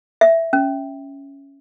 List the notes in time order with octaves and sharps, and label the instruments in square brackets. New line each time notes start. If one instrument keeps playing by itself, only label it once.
[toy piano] E5
C#4